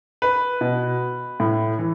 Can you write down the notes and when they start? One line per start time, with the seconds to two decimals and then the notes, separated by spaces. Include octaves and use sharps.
0.22 B4
0.61 B2
1.40 A2
1.79 E3